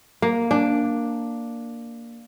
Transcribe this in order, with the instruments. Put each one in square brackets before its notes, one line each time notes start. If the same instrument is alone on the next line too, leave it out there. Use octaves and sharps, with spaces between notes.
[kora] A#3
D4